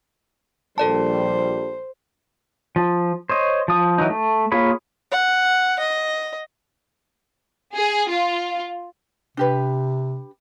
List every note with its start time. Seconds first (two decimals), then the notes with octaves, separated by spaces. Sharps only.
0.78 A#1 G3 A4 C5 D5 A5
2.76 F3
3.29 C5 C#5 D#5
3.68 F3 D#6
3.98 E3 F#3 D#4
4.10 A3
4.52 A#3 F4 G#4 C#5 B5
5.11 F#5
5.79 D#5
7.74 G#4
8.10 F4
9.37 C3 D4 G4 B4